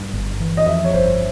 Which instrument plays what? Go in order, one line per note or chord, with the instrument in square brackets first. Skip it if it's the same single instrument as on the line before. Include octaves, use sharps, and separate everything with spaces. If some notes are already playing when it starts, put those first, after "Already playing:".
Already playing: [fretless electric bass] G2
G1
E3
[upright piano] D#5
[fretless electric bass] F2 [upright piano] E5
[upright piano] C#5
[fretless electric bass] G1 [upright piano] C5